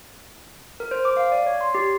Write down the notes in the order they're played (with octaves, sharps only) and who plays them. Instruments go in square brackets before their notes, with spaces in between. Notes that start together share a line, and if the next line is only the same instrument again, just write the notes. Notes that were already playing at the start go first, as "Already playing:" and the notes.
[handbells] A#4
C5
D6
F5
D5
C#5
C6
G4